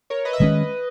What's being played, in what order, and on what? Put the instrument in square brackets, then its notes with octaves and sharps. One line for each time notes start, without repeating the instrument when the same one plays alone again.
[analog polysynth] A#4 C#5
B4 D#5
E5
[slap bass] D#3 G#3 C#4 [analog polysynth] B4 D#5